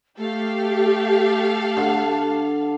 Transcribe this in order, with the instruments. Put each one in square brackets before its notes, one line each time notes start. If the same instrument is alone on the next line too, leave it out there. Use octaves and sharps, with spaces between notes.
[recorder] A3 [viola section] G4 [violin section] A4 F5
[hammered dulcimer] D3